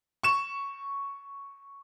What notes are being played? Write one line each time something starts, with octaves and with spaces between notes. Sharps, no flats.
C#6 E7